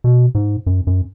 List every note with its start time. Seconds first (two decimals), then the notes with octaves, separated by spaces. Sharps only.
0.04 B2
0.35 G#2
0.66 F#2
0.87 F#2